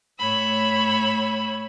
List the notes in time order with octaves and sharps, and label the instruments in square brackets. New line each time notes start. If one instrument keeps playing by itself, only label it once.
[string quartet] A2 C#5 B5 E6